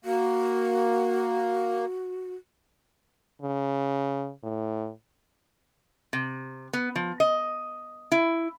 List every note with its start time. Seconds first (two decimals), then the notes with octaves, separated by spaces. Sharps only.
0.05 A#3 F#4
3.42 C#3
4.43 A2
6.13 C3
6.73 B3
6.96 F3
7.20 D#5
8.12 E4